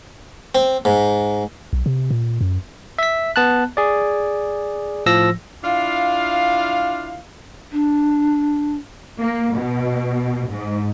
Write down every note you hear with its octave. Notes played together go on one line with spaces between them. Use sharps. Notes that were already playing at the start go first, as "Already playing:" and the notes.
C4
G#2
B1
C3
A#2
F#2
E5 B6
B3 A5 F#6
G#4 D5
A2 F3 E6 A#6
D4 E4 F4 F5
D4
A#3
B2
G#2